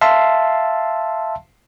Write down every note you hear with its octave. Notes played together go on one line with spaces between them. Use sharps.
E5 F5 A5 C6